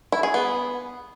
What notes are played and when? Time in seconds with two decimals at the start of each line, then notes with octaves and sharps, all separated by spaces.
0.12 E4
0.23 G#4
0.34 B3